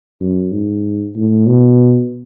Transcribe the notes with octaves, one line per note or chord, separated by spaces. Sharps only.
F#2
G#2
A2
B2